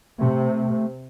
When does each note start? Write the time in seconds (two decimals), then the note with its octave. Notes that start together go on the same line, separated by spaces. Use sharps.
0.18 C3 A3